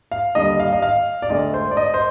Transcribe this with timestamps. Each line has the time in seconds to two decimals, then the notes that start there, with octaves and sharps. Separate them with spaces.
0.12 F5
0.35 D#2 D3 G3 D#5
0.60 F5
0.73 D#5
0.82 F5
1.22 D5
1.30 D2 D3 G#3 D#5
1.54 C5
1.71 D5
1.77 D#5
1.94 C5